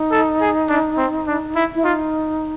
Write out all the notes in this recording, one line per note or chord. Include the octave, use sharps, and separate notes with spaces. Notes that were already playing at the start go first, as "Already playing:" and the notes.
Already playing: D#4
A4
G#4
D4
C4
D4
E4
E4
D#4 F4